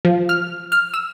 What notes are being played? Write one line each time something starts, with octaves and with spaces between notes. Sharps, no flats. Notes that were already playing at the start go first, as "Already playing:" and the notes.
F3
F6
F6
E6